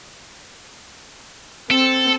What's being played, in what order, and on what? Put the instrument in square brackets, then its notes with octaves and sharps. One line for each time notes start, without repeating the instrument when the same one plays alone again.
[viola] C4 [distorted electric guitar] A4